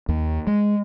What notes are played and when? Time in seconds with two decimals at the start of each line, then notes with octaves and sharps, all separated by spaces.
0.08 D#2
0.47 G#3